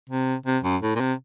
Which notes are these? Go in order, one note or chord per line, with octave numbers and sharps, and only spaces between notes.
C3
C3
F#2
A2
A#2
C3